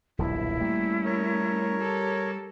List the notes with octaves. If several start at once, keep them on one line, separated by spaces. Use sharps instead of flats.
D#1 B1 G2 E4
G3 A3 A#3 C#4
A#4 C#5
G4 A4